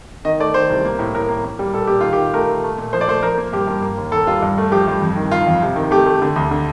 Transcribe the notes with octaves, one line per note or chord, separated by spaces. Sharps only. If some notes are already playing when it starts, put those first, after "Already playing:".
D#3 D#5
A3 D5
D#3 C5
C2
A#3
A2
A2 A#4
A#3
A#3
G3
A#2 A4
A#2 G4
D#3 F4
G4
D#3
A3 A#4
A3
A3
A#2
F3 C5
D5
A3 C5
F3 A#4
A#3
G2 G4
G2
A#3
D#2
D#2 A4
G3 F4
G2
A3
F3 G4
G2
F2
D#3
D#3 F4
F2
C3
D#3
A3 G4
A3
D3
D2
D3